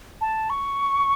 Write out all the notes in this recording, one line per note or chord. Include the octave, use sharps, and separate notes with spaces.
A5
C#6